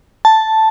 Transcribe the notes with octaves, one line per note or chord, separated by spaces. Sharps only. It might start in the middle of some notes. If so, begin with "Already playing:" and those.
A5